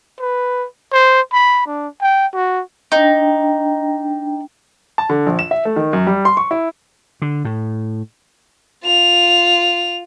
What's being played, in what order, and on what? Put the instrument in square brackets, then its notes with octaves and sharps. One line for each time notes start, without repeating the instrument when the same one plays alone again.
[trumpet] B4
C5
B5
D4
G5
F#4
[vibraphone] D4 G5 [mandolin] D#4
[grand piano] A5
D3
A#1
E7
E5
A3
D#3
F#2
G3
C6
C#6
E4
[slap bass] D3
A2
[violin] F4 F7